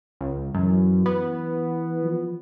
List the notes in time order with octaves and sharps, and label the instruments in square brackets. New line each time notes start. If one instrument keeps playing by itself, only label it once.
[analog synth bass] C#2
[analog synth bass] F#2 [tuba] E3
[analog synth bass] B3
[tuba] F3